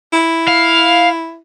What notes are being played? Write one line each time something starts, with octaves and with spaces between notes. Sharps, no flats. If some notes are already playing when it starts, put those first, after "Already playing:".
E4
F5